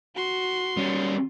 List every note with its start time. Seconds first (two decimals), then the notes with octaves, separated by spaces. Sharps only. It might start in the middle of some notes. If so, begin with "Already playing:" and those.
0.16 F#4 C6
0.77 G3 C#4